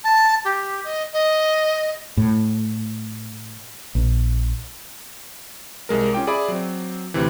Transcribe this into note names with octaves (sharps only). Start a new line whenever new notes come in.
A5
G4
D#5
D#5
A2
A#1
C2 G#3 A#4
C#4 F4 G5 D6
G#4 D5 E5 B5 D6
F#3 C4
D2 C3 E3